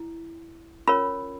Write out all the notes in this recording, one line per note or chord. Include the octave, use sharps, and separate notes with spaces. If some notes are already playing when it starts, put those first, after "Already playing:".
Already playing: E4
C#4 F4 A#4 C#5 B5